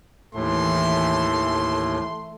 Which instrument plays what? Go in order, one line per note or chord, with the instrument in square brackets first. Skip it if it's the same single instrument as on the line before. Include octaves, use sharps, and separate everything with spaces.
[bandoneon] D#2 A2 [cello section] E3 [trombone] A3 [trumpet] C6